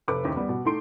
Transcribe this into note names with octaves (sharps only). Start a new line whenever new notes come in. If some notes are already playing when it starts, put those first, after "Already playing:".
F1 A4 B4 D6
F#1 D#2 G4
G3 B3
B2
A3 D#4 C6 D7